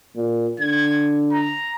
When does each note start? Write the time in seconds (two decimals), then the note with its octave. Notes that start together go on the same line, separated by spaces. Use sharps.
0.16 A#2
0.60 D3 G#6
1.32 A#5